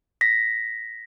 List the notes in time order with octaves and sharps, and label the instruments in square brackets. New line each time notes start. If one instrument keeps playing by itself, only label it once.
[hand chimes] A#6 B6